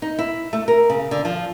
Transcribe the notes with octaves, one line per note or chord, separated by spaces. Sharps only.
D#4
E4
A3
A#4
C#3
D3
F3